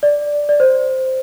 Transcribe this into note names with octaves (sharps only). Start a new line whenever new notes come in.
D5
D5
C5